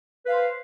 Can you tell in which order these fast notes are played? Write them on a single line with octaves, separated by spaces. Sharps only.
B4 F5 C5